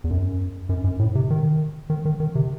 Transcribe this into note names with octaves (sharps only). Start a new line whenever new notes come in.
E2
F#2
F#2
F#2
A2
C3
D#3
D#3
D#3
D#3
C3